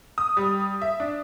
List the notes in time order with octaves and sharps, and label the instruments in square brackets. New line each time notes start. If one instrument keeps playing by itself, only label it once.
[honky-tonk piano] D#6
G3
E5
D4